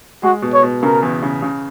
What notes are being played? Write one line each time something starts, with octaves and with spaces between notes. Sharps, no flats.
G#3 F#4
B2
C#5
B2
C#3 A#4
E2
C#3
C#3